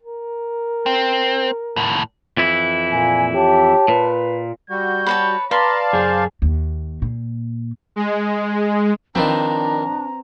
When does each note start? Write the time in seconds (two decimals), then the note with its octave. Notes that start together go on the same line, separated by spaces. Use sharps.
0.03 A#4
0.86 C4
1.76 D#2 A2
2.37 F2 E3 E4
2.92 A#2 G#5
3.34 G4 C#5 A5
3.88 A#2 B4
4.70 G3 F#4 G6
5.07 B4 C#5 A5
5.51 B4 D5 F5 A5 A#5 C6
5.93 F#2 G#4 C5
6.42 D#2
7.02 A#2
7.96 G#3
9.15 D#3 F3 C4 D4 B4 D5 A#5